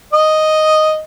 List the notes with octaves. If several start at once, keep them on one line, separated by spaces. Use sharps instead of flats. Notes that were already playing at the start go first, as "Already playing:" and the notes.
D#5